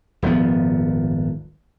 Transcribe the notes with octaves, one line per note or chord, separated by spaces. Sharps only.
D#1 G#1 F3 B3